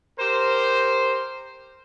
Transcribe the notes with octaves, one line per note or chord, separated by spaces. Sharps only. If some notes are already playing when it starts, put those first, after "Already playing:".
G4 A#4 C5